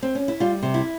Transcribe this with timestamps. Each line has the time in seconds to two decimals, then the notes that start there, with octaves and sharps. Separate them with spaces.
0.03 C4
0.15 C#4
0.28 E4
0.40 G3 F4
0.62 C3
0.74 E4